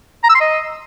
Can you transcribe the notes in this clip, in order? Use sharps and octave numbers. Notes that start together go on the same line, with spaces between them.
A#5
E6
C6
D#5